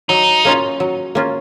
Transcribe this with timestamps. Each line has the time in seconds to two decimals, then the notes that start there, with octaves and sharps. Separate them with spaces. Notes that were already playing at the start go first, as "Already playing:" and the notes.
0.09 F#3 D#4
0.45 A#3 C#4 F4
0.80 F#3
1.15 A#3 C#4 F4